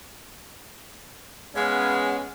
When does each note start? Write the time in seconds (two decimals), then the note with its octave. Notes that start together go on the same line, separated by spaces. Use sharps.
1.56 G#3 B3 C#4 B4 C#5 F5 F#5